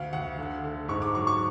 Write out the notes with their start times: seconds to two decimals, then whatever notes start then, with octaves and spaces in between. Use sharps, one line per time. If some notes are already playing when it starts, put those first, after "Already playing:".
Already playing: D2 F5
0.13 D2 F#5
0.38 D3
0.64 D3
0.88 G#2 C#6
1.02 D6
1.15 F#3 C#6
1.27 C#6